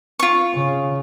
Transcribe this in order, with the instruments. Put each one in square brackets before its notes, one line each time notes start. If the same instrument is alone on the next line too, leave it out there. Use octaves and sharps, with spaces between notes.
[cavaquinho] F4 C#6
[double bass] C#3